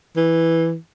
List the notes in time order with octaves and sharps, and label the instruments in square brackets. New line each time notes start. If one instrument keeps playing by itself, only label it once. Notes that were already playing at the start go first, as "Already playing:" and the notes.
[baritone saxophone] E3